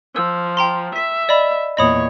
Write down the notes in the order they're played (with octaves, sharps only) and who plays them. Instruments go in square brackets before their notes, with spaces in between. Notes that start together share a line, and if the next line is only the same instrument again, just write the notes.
[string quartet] F3 [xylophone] E6
[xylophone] G5 A#5 C6
[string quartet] E5 [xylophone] B6
[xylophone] D5 D#5 B5
[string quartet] E2 A#2 C#5 [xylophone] D#5 B5 D#6